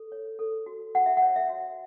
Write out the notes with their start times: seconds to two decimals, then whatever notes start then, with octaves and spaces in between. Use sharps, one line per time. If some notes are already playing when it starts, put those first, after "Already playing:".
Already playing: A4
0.12 C#5
0.39 A4
0.66 F#4
0.95 F#4 F#5
1.06 E5
1.17 F#5
1.22 C#5
1.36 E5
1.49 F#4